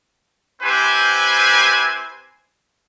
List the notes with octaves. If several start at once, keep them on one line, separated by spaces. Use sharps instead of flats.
C4 E4 G4 B4 C5 G#5